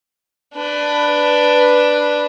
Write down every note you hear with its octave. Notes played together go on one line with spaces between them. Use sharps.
D4 B4